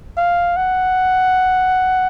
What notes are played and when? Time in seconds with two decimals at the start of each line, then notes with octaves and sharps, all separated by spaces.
0.17 F5
0.56 F#5